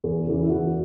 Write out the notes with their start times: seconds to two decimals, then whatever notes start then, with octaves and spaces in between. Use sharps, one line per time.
0.04 E2
0.27 C#3 E3
0.41 E4
0.49 E2 F#4